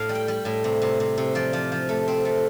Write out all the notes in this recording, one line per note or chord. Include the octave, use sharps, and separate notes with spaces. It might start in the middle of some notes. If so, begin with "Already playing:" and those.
Already playing: A2 F5
G3
G5
G3
A2
C3
C3
C3
C3
F3 D5
F3
F3
A3
C4
A3